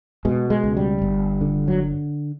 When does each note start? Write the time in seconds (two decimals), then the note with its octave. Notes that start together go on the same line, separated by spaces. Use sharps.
0.25 B2 G#3
0.50 G#3
0.64 C#2
0.77 G3
1.02 G1
1.41 D3
1.68 F#3